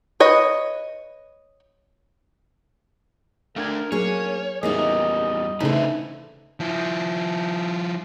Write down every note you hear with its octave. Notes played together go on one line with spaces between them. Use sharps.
B4 C#5 D#5
A3 D4 A#4 F5 G5 G#6
F#3 A#3 C#4 D4 G#4 C#5
E2 E3 G3 A#3 D#4 G#4 D#5
C#3 E3 A3 D4 D#4 B4 C5
F3 E4